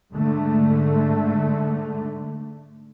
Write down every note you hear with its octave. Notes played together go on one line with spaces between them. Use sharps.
G#2 D3 A3